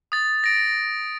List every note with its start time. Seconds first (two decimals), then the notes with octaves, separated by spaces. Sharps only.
0.12 D#6 A6
0.44 A#6 D7